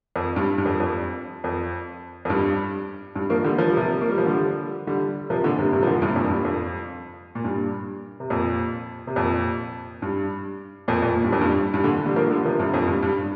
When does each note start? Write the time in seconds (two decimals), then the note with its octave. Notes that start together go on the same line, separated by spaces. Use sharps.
0.16 F2
0.36 G2
0.58 G2
0.66 F2
0.80 F2
1.44 F2
2.25 F2
2.30 G2
3.16 G2
3.30 F3 A#3
3.44 D3 G3
3.58 F3
3.68 G3
3.77 C3 F3
4.01 A#3
4.10 G3
4.18 F3
4.26 D3 G3
4.87 D3 G3
5.30 C3 F3
5.44 A#2 D3
5.58 G2 C3
5.73 G2 C3
5.83 F3
5.87 A#2 D3
6.02 G2 C3
6.16 F2 A#2
6.30 G2
6.45 F2
7.35 A#2
7.45 G2
8.20 C3
8.30 F2 A#2
9.07 C3
9.16 F2 A#2
10.02 G2
10.88 F2 A#2
11.02 F2 A#2
11.16 A#2
11.24 G2
11.33 F2
11.41 G2
11.74 G2
11.84 A#2 D3
12.06 D3 G3
12.16 F3 A#3
12.31 D3 G3
12.45 C3 F3
12.59 G2 C3
12.74 F2 A#2
12.88 G2
13.03 G2